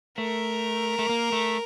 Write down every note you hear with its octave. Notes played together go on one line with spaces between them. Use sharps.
A3 A#4
A3
A#3
A3